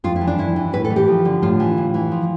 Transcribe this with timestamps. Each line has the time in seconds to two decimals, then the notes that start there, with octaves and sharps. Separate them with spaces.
0.04 F2 F4
0.16 E4
0.21 E3
0.27 D4
0.38 F2 E4
0.56 E3
0.73 A2 B4
0.84 A4
0.90 E3
0.96 G4
1.08 F3
1.25 D3
1.42 A2 F4
1.60 E3
1.77 A2
1.94 E3
2.11 F3